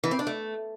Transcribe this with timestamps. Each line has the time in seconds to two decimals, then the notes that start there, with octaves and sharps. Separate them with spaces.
0.04 E3
0.11 C4
0.19 D4
0.27 A3